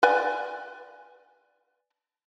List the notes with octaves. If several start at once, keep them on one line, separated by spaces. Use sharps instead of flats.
B4 D5 G#5